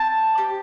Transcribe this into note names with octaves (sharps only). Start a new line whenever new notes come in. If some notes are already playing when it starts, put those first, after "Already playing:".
Already playing: C4 A5
G4